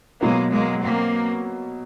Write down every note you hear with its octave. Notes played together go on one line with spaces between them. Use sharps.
B2 F#3 G#3 A#3 B3
G#3 A#3
A#3 C4